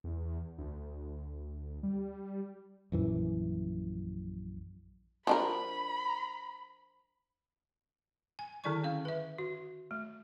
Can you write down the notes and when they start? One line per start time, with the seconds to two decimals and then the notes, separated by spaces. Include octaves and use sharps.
0.04 E2
0.58 D2
1.83 G3
2.92 A#1 F#2 E3
5.27 F3 D4 A#4 B5
8.39 G#5
8.64 D3 D#3 E4 D5 G#5 C#6
8.84 C#4 F5
9.05 B4 E5
9.38 F#4
9.91 A3